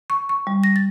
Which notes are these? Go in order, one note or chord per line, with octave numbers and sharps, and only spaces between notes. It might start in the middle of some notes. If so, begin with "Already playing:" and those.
C#6
C#6
G3
A#6
A6